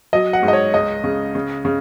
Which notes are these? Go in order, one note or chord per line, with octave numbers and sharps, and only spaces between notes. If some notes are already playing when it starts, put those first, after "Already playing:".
F#3 D#5
F#5
G#2
D#5
C#5
C#2 D#5
C#3
C#3
C#3